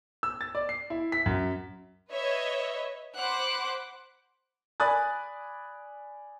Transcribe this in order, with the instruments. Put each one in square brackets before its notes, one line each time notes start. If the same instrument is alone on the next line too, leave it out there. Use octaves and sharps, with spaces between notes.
[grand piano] E6
A6
D5
C7
E4
B6
F#2
[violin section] B4 C#5 D#5 E5
C5 F#5 B5 D6 F#6
[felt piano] D5 G#5 B5 D#6 F#6 A6